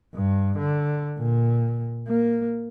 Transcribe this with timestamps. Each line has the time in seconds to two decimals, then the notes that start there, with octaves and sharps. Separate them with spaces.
0.15 G2
0.58 D3
1.19 A#2
2.08 A#3